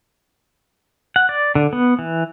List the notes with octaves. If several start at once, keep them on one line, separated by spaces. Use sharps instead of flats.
F#5
D5
D3
B3
E3